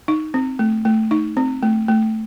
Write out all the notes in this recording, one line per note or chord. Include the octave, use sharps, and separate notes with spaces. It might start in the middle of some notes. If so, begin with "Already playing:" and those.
D#4
C4
A3
A3
D#4
C4
A3
A3